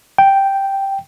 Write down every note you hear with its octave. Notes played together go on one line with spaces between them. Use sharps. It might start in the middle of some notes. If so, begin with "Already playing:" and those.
G5